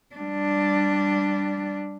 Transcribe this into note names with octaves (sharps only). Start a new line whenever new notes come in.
G3 D4